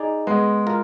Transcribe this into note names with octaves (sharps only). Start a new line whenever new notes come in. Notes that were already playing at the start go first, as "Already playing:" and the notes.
Already playing: D#4 G#4 D5
G#3 B3
F4 A#4